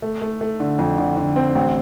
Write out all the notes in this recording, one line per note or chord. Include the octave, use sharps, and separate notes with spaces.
A3
A3
A3
D3
F2
D3
D3
C4
A1